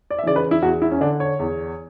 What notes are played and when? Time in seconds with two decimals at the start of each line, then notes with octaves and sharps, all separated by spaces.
0.10 D5
0.19 E5
0.23 C#3 E3 D5
0.36 B4
0.51 E4
0.62 E2 F#4
0.82 E4
0.92 C#4
1.01 D3 D4
1.20 C#5
1.39 E2